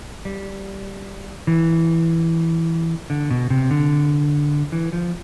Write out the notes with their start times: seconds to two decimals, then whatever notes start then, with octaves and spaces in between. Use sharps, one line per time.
0.25 G3
1.47 E3
3.10 D3
3.31 B2
3.50 C3
3.71 D3
4.72 E3
4.93 F3